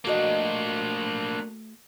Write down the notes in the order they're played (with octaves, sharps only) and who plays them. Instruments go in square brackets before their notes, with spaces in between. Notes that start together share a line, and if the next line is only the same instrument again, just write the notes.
[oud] A3 F#4 D#5 [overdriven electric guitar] A#3 D4